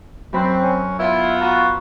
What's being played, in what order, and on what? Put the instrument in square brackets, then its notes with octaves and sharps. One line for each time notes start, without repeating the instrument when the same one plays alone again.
[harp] F#2 B5 F#6 [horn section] C4
[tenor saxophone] C#4
[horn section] B3 F4 [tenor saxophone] E4
[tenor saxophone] F#4 [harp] A#5 C#6 E6